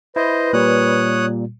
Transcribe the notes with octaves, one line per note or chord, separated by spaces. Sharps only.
E4 B4 C5 D#5
A#2 G3 C#5 D#6 F#6